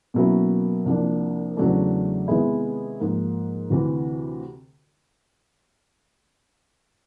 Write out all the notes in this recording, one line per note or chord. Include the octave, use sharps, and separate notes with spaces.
B2 F#3 A#3 C#4 E4
C2 C3 F3 A#3 D4
E2 C#3 F#3 A3 D4
C3 D#3 G#3 B3 E4
G#2 F3 A#3
D2 C3 E3